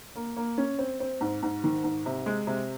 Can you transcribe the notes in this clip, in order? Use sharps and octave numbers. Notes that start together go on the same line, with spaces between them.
A#3
A#3
C#4
C4
C4
G#2
G#2
D#3
G#2
C3
G#3
C3